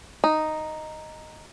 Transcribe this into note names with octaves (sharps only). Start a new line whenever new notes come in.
D#4